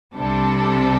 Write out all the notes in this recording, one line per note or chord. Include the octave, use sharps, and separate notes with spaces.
C2 C3 G3 D4 A4